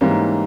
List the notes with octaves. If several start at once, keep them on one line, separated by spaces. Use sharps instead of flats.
G#2 E3 G3 A#3 C#4